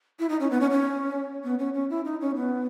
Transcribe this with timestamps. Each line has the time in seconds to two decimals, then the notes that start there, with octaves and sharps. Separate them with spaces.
0.19 E4
0.29 D#4
0.40 C#4
0.50 B3
0.60 C#4
0.71 C#4
1.44 B3
1.59 C#4
1.74 C#4
1.90 E4
2.05 D#4
2.21 C#4
2.36 B3